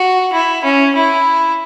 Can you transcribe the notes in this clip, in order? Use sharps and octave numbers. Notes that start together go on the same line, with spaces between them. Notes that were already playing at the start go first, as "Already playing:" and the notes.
Already playing: F#4
E4
C#4
E4